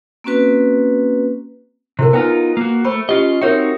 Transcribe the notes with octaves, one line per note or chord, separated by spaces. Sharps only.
A#3 C4 C#4 F#4 B4
C3 E4 A4 A#4
B3 D#4 F4 B4 G#5
A#3 F#4
A3 C5 B5 C#6
C#4 F4 G4 D#5
C4 D#4 F#4 A#4 C#5 E5